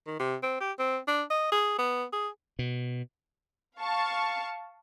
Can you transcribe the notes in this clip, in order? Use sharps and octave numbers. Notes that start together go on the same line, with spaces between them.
D#3
C3
C4
G4
C4
D4
D#5
G#4
B3
G#4
B2
F5 A5 C#6